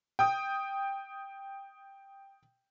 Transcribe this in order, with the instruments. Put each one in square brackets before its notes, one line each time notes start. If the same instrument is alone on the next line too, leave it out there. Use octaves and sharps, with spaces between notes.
[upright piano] G5 D#6